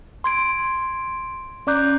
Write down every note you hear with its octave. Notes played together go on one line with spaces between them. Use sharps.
C6 G#6 D7
C#4 D5 A#5 D6 F#6 G6